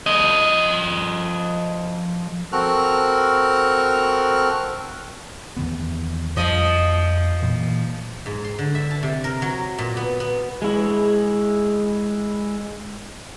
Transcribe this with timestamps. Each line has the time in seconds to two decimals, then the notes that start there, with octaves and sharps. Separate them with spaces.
0.06 F3 D#5
2.52 C4 F#4 A4 A#4 F6 F#6
5.57 E2 D#3 B3
6.36 F2 F3 G3 D#5
7.42 A#2 E3 F#3
8.26 G#2
8.44 C6
8.59 D3
8.75 E5
8.91 A5
9.03 C3
9.24 A#4
9.42 F#3
9.78 A#2
9.97 B3
10.20 B3
10.62 G#3 E4